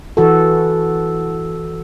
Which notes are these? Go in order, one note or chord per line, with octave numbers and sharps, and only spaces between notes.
E3 F#4 A4